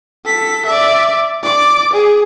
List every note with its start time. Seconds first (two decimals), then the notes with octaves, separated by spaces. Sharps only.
0.24 A4 B6
0.66 D5 E5
1.43 D5 D6
1.93 G#4